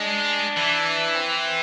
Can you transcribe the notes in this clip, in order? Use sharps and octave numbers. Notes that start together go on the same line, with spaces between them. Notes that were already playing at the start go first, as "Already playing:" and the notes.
Already playing: G#3 D4
E3
C4